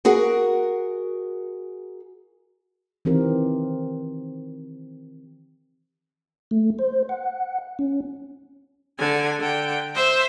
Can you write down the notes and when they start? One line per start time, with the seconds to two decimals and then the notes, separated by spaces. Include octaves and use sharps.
0.05 F#4 G#4 A#4 F#5
3.05 D#3 E3 C4 G4 A#4
6.51 A3
6.79 C5
7.09 F#5
7.79 C#4
8.99 D3 G#5
9.39 D3 G5
9.95 C5 E5